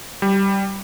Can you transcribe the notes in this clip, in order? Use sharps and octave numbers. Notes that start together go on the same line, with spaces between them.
G3